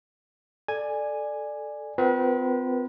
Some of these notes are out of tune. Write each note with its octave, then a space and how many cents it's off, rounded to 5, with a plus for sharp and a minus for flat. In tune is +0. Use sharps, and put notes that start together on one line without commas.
A4 +0 D5 +15 G#5 +0
C4 -40 F4 +10 B4 -35